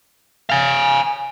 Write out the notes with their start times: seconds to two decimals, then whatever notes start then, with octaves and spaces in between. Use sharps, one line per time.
0.50 F5 G#5